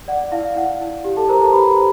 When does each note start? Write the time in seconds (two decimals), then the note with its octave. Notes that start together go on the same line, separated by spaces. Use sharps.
0.08 D5 F#5
0.32 E4 F5
0.56 E4 F#5
0.80 E4
1.04 G4
1.17 A4 A5
1.29 A#4 C5 A#5
1.40 A4 A5
1.52 G4 B4 B5
1.77 C5